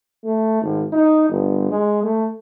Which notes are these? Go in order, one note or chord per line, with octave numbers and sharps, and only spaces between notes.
A3
G#1
D#4
G1
G#3
A3